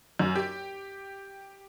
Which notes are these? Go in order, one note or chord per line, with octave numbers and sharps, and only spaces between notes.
F#2
G4